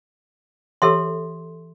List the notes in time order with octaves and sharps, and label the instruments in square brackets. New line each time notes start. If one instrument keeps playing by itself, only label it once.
[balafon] E3 G4 C#5 [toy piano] A4 E5 C6